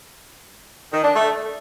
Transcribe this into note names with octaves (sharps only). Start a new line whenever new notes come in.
D#3
D4
A3